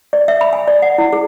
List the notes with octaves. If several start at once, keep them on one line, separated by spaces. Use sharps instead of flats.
D5
E5
B5
G#5
D5
F#5
E4
G#4